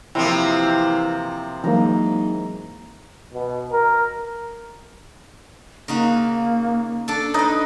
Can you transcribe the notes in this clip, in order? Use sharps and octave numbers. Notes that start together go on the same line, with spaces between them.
C3 E3 F3 A#3 C4 E4 G5
G#2 E3 F#3 A#3 A#5
B2
A#4
C#3 A#3 D#4 F#4
D4 A4
D#4 B4 D#5